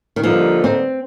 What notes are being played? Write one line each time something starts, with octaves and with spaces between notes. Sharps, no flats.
D#3
G2 D3 F3 G3 A#3 D#4
C4